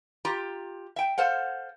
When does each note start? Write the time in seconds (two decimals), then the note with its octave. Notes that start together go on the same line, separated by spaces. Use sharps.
0.25 F4 G4 A#5
0.96 E5 G5
1.18 A4 C5 F5 F#5